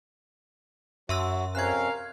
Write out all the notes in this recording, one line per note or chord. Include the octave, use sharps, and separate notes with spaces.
F#2 F#3 F#4 E5 C6 E6
F2 C3 C#4 A#4 F5 F#6 G#6